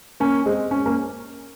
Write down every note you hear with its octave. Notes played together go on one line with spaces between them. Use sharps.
A#3 C#4
G#3 C4
C#4
A#3 C#4